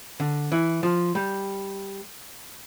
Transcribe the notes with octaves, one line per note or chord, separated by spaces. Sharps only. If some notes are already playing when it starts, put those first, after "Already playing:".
D3
E3
F3
G3